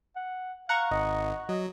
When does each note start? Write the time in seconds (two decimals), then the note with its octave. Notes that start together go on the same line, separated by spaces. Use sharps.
0.16 F#5
0.69 F5 F#5 A#5 C#6
0.91 G#1 D#5
1.49 F#3 D#5